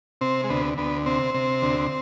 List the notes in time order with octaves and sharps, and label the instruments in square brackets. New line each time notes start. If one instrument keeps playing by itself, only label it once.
[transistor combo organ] C3 C4
G#3
D2 B3
D2 B3
C3 C4
C3
D2